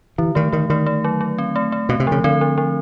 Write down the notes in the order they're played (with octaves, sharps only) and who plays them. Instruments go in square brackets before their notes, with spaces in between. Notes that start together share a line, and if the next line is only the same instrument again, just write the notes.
[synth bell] D3 [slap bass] E3
[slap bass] D#3 [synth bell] A3
[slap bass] D#3 [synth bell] A3
[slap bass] D#3 [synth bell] A3
[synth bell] A3
F#3
F#3
C4
A3
A3
[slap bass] B2 [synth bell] C4
[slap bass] C3
[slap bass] C#3 [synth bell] F3
[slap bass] D3 [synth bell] C4
[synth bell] F3
F3